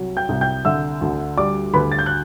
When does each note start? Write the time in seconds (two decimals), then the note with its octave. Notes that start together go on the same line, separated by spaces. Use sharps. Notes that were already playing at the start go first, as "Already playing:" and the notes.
Already playing: C2 F#3
0.17 G5 G6
0.29 C2
0.41 G5 G6
0.65 D3 E5 E6
1.01 D2
1.37 G3 D5 D6
1.74 D2 B4 B5
1.92 A6
1.99 G6
2.06 F#6